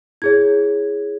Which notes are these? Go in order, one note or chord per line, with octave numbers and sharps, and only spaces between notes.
E4 G#4 C#5 G#6